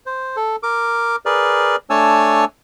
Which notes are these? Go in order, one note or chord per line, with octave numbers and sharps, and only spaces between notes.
C5
A4
A#4 D6
G#4 A#4 B4 D5
A3 D4 C#5 G#5 A5 E6